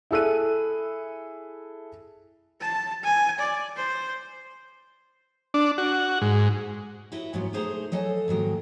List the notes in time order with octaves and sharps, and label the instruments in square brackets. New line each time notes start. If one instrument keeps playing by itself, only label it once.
[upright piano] E4 G#4 A4 E6 F#6 D#7
[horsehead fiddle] A5
G#5
D5
C5
[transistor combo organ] D4
F#4
G#2
[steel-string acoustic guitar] E4 F#4 B4 D#5 E5
D#2 G#2 B2 F#3 B3
B2 A3 D#4 G#4 C5 A#5
F#3 A4 D#5 F5 G#5
G#2 D#3 F#3 A#3